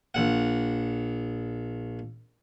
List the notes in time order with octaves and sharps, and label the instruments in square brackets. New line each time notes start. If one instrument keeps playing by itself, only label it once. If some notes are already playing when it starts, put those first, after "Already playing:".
[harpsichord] A#1 F#5